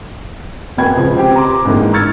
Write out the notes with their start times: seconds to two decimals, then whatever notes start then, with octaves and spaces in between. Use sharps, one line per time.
0.78 E1 F#2 B2 B3 G5 G#6
0.96 C#2 F3 G#3
1.17 C4 G4
1.36 A#5 C6 D6
1.65 G#2 D3 E3 A#3
1.93 C#6 E6 F6 G#6 A6 C#7